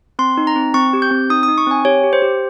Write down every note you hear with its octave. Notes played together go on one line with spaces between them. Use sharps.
C4 C6
D#4
A#5
C4
C4 C#6
G4
G6
C4
D#4 D#6
D#4 D#6
C#6
C4 G#5
G4 C#5
G4
C5
G4